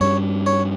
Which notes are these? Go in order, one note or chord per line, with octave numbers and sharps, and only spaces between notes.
G2 G3 C#4 C#5
C#5